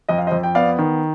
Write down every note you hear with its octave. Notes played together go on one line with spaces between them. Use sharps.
F2 D#5
F5
C5 D#5
F2
G5
B3 D5 F5
D#3